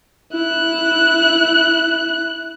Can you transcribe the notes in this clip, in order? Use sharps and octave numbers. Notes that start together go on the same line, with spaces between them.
E4 F#6